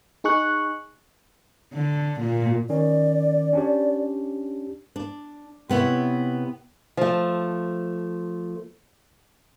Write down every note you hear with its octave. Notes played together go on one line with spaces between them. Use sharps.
D#4 G#4 C#6 F#6
D3
A#2
D#3 C#4 D5
C#4 D4 G4
D4
C3 B3 E4 C#5
F3 A3